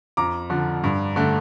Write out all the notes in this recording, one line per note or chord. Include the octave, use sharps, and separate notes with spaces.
F2 A#5 D6
D3 F3
G2
D3 A3